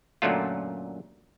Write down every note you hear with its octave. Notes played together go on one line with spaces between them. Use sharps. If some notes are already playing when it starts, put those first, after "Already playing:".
F#2 A#2 D3 F#3 A3 F4